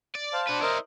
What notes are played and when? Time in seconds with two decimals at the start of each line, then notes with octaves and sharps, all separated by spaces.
0.15 D5
0.33 C5 F5 A5
0.48 D4 F#4 B4 C5
0.62 E4 A#4 C5 D5 D#5